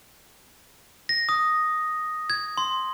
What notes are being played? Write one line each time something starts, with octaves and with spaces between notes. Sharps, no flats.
A#6
D#6
G#6
C6